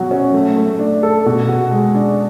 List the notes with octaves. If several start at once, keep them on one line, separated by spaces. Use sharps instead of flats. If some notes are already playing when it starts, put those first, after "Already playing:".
Already playing: B2 F#3 F#4
C#4
A3
A3
D4
A4
B2
F#4
G#3
D4